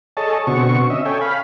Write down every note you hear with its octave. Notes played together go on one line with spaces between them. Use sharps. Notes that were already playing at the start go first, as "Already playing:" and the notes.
G#4 A4 C#5 D#5 A5
B2 D3 C4 F#4 C#6
C#4 D#5 E5
A4 C#5 G5 G#5
F5 B5